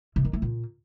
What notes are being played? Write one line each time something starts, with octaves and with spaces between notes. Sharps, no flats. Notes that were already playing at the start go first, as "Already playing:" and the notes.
C3
D#3
A3
A#2